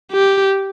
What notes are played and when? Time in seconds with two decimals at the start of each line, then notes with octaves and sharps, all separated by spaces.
0.12 G4